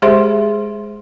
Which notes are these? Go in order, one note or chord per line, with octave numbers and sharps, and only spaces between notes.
G#3 G4 G#4 C5 E5 C6